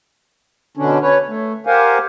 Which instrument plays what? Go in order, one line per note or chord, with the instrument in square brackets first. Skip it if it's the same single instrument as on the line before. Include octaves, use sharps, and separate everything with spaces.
[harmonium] B2 D3 C#4 D4
C#4 B4 C#5
A3
G4 A#4 C5 F5 F#5 G#5